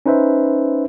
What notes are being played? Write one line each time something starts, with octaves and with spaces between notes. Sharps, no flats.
C#4 D#4 B4 C5 E5